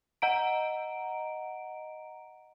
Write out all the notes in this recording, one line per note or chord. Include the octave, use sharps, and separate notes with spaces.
D#5 F#5 A#5 D7